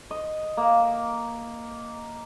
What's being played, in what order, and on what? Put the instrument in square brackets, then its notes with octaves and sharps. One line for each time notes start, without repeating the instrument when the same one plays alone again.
[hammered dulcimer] D#5
A#3